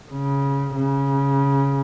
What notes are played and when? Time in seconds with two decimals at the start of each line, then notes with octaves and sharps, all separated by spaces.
0.11 C#3
0.75 C#3